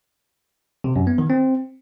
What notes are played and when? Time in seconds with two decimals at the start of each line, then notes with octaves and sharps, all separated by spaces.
0.84 C3
0.96 F#2
1.07 B3
1.18 D#3
1.30 C4